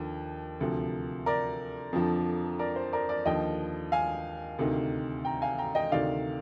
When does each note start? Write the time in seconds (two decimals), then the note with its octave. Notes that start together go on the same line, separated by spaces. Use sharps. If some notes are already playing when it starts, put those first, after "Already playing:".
Already playing: D#2 D3 F3
0.61 D2 C3 F3
1.26 A#4 D5
1.93 F2 D3 F3
2.59 A#4 D5
2.76 C5
2.93 A#4 D5
3.09 A#4 D5
3.25 D#2 D3 F3 D#5 G5
3.92 F5 G#5
4.59 D2 C3 D#3
5.25 G5 A#5
5.42 F5 G#5
5.58 G5 A#5
5.75 D#5 G5
5.92 D2 C3 D#3 D5 F5